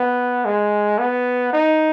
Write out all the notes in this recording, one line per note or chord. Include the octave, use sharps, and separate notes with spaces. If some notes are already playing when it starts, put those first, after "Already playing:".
Already playing: B3
G#3
B3
D#4